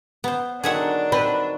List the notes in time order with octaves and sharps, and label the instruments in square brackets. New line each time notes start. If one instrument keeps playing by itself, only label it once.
[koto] B3 C5
[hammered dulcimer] D3 D#3 F#3 [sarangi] D4 [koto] G#4 E5 F#5
[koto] C4 [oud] B4